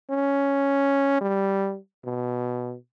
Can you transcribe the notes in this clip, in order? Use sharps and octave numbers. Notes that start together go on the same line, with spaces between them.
C#4
G3
B2